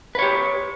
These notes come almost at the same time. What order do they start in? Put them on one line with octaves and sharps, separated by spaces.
B4 C#5 G4